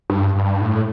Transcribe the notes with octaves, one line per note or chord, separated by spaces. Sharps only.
G2
G2
A2